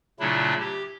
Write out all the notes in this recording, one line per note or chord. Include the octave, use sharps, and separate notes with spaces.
A#2 C#3 F#3 A3 D4 E4
G4